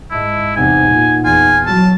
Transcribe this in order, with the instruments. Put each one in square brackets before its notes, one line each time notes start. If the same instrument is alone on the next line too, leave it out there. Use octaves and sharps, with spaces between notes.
[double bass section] G#2 [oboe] E4 [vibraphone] D#5 E5 A5
[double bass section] E2 C3 [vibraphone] D#4 E5 F#5 [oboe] G#5
[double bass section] A#2
[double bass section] E2 [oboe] F4 [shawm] G#5
[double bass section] F#3 [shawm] A5